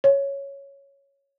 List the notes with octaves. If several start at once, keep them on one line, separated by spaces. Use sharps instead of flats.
C#5